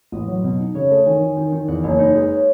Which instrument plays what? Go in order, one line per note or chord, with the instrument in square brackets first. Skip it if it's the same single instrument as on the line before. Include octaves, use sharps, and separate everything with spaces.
[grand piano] A1 [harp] D#5
[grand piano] F#3
B2
D#4
[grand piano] C#3 [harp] C#5
[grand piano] A3 [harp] D#5
[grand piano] D#3 [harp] G#5
[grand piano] D#3
D#3
D#3
[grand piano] E2 [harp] F#5
[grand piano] F#1 [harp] C#5
[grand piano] D#4 [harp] D#5
[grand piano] G#3 [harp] B4
[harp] C#5